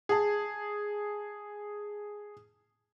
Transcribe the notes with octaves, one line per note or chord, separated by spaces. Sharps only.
G#4 A5